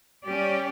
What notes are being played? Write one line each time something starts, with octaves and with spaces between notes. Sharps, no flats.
G3 C#4 G4 D5